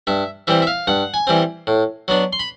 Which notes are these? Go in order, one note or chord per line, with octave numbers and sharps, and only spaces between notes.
G2 E5
E3 G3 C4 E5
E5
F5
G2 F#5
G#5
E3 G3 C4
A2
F#3 B3 D4
C6
B5